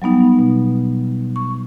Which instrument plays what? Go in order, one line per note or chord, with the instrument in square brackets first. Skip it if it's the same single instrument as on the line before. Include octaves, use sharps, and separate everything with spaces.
[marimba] F#3 G3 B3 D#4
B2
C#6